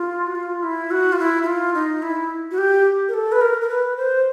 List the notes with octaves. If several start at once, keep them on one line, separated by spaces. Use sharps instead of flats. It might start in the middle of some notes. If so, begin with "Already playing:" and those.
Already playing: F4
F#4
F4
E4
F#4
F4
E4
E4
F4
D#4
E4
F#4
G4
A#4
A4
B4
A#4
A#4
B4
C5